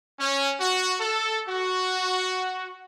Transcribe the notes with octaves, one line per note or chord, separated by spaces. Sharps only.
C#4
F#4
A4
F#4